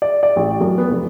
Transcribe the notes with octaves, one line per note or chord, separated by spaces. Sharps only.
D5
D5
A1
F#2
B3
F1